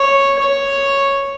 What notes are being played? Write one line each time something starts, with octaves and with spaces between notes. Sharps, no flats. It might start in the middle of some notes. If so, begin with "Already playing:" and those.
Already playing: C#5
C#5